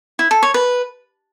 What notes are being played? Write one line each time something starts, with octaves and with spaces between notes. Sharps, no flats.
E4
A4
C#5
B4